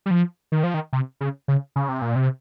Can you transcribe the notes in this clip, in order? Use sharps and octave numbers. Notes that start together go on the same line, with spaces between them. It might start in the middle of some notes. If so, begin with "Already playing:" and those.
G3
F3
D#3
F3
D#3
C3
C#3
C#3
C#3
C3
A#2
C3